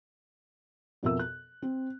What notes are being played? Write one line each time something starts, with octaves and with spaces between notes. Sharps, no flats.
F2 B2 F#4 A#4 E5 E6
F#6
C4